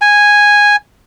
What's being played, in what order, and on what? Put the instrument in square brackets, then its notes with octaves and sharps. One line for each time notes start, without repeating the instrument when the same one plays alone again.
[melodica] G#5